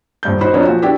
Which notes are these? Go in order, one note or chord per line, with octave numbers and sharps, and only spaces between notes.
D#1 G2 G6
D#4 F#4 C5 B5
F2 F3 F#3 B3 C#4 D4
A#2 F3 F#4
B3 D4 E4 F#4 G4 B4